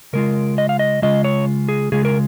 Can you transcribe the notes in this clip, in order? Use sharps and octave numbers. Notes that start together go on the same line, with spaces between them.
C#3 G#3 F4 A#4
D#5
F5
D#5
C#3 G#3 F4 D#5
C#5
G#4
C#3 G#3 F4 G#4
A#4